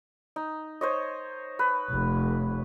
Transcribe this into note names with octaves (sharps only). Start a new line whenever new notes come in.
D#4
C5 C#5 D#5
B4
F1